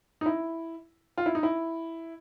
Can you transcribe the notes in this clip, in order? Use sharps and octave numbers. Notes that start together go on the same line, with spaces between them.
D#4
E4
F4
E4
D#4
E4